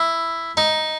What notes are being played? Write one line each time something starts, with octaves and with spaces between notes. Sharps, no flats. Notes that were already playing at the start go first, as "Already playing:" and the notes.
Already playing: E4
D#4